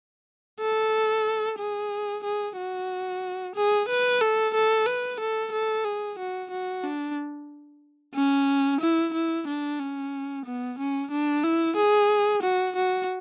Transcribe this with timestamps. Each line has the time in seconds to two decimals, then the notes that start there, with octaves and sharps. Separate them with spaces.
0.60 A4
1.59 G#4
2.24 G#4
2.57 F#4
3.56 G#4
3.89 B4
4.21 A4
4.55 A4
4.86 B4
5.20 A4
5.52 A4
5.85 G#4
6.19 F#4
6.51 F#4
6.84 D4
8.15 C#4
8.81 E4
9.14 E4
9.47 D4
9.80 C#4
10.45 B3
10.79 C#4
11.11 D4
11.44 E4
11.77 G#4
12.42 F#4
12.76 F#4